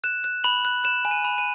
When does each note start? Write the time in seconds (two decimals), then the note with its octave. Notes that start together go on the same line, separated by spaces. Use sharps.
0.04 F#6 E7
0.24 F#6
0.44 B5 F#7
0.65 F#6
0.84 F#6 E7
1.05 G#5
1.11 D#7
1.25 B5
1.38 D#7